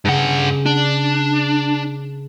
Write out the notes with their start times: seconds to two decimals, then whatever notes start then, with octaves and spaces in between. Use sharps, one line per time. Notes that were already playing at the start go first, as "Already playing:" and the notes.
0.05 G2 C#3 F#5
0.66 D4